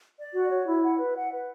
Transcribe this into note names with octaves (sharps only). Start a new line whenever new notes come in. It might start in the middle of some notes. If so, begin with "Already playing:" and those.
D5
F#4
C#5
E4
F#5
B4
F#5
B4